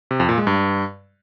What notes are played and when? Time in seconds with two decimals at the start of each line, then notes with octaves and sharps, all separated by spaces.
0.11 C3
0.20 F2
0.29 A#2
0.38 G#3
0.47 G2